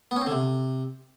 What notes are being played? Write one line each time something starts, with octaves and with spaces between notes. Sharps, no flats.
B3
C#4
C4
D3
C3